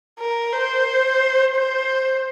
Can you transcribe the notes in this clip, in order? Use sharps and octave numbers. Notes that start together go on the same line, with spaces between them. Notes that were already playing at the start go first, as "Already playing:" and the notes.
A#4
C5
C5